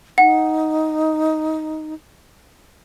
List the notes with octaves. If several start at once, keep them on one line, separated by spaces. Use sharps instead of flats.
D#4 F#5